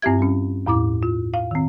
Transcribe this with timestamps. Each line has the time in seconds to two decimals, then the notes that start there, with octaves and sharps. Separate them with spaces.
0.02 G2 C4 E4 G4 E5 G#6
0.19 G3 C#4
0.66 E2 A2 E4 D6
1.03 F4
1.34 F5
1.51 D#3 C4